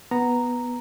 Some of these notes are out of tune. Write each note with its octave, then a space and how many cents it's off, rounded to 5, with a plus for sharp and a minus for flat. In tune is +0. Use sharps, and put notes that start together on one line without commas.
B3 -5 A#5 -5